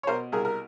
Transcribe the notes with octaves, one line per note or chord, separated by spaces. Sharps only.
C#5
B2 A#4 C5
C2 G#4 A#4
A#4